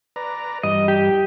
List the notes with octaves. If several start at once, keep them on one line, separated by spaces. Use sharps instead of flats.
B4 D5 A#5
G2 E3 G3 D#5
G4